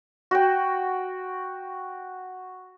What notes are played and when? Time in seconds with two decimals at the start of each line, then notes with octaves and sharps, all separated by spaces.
0.31 F#4 G5